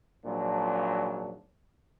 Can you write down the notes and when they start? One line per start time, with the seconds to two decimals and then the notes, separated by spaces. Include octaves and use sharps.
0.24 G#1 A#2 F3 F#3 D4